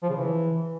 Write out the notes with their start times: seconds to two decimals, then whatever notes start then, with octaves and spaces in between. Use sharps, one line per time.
0.03 F3
0.09 C#3
0.16 E3